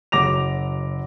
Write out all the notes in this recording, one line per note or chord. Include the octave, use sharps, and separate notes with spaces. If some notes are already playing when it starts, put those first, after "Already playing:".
F#1 F#3 D6 A#6 F7